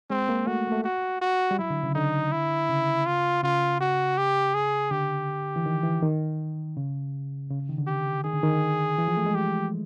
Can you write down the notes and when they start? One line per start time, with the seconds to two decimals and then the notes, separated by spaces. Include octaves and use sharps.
0.10 G#3 C4
0.29 A#3
0.47 A3 F#4
0.67 A#3
0.72 A3
0.84 F#4
1.21 F#4
1.51 G3
1.59 F#3 E4
1.70 D3
1.83 C#3
1.95 D3 D#4
2.32 E4
2.70 C#3
3.06 F4
3.43 C#3 F4
3.80 F#4
4.18 G4
4.54 G#4
4.91 D3 G4
5.56 E3
5.66 D#3
5.84 E3
6.02 D#3
6.77 C#3
7.50 C#3
7.69 D#3
7.78 D3
7.87 G4
8.24 D#3 G#4
8.33 D3
8.43 D#3
8.98 E3
9.08 F3
9.17 A3
9.26 G#3
9.35 G4